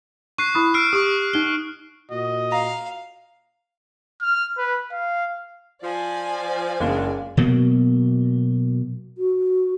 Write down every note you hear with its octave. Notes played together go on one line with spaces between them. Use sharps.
C#6 F#6 C7 D#7
E4 B5 D#6
E6 F6 C7 D7
G4 C#6 D#6
D#4 G7
A#2 F#4 D#5
F5 A#5
F6
B4
F5
F3 D5 G#5
F#1 G#3 D4 F4
B2 F#3 A#3
F#4